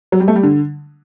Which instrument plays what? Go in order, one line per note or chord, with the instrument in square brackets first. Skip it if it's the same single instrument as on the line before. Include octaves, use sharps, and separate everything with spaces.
[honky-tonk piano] F#3
G3
A3
G3
D3